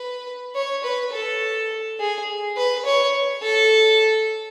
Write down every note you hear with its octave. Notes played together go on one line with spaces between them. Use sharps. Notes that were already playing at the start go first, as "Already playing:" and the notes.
Already playing: B4
C#5
B4
A4
G#4
B4
C#5
A4